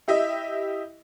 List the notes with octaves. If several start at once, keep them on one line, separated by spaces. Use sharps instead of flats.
E4 G4 D#5 E5